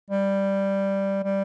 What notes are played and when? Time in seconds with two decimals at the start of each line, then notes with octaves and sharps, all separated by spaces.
0.11 G3
1.24 G3